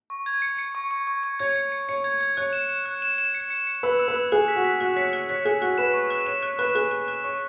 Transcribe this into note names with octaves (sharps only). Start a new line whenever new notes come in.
C#6
G#6
C#7
C#7
C#6
C#6
C#6
C#6
C#5 G#6
C#7
C#7
C#5 C#7
G#6
G#6
C#5 F#6
E7
E7
F#6
E7
E7
C#7
C#7
C#7
B4 E6
E6
B4
E6
G#4 F#6
B6
F#4
B6
F#4 F#6
C#5 B6
F#6
C#5 B6
G#4 F#6
F#4 F#6
B4 E7
C#6
F#6
C#5 E7
C#5 F#6
B4 F#6
G#4 F#6
F#6
F#6
C#5 C#6